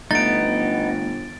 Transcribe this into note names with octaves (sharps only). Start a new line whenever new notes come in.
G1 A3 B3 D#4 A6 D7